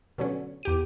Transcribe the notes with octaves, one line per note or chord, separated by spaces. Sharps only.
B2 D3 F#3 C#4
E2 G4 D#7